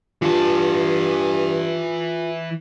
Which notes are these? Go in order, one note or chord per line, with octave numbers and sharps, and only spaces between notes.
G2 E3 F4 A5